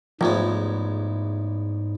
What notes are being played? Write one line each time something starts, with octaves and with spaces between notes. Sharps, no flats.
A1 E2 G#2 F3 G#3